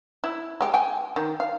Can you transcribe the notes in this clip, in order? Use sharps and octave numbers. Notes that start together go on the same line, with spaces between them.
E4
G#3 G4
G5 G#5
D#3
F5